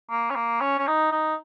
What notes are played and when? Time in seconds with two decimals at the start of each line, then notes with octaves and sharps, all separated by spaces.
0.10 A#3
0.30 C#4
0.35 A#3
0.61 C#4
0.78 C#4
0.87 D#4
1.12 D#4